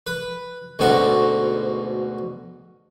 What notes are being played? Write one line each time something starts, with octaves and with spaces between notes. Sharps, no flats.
B4
D2 G#2 B2 C4 F#4 C#6